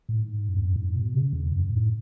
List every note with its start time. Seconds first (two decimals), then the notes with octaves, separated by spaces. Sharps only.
0.09 A2
0.20 G#2
0.49 F#2
0.57 E2
0.65 F#2
0.76 G#2
0.96 B2
1.15 C#3
1.33 E2
1.52 F#2
1.70 A2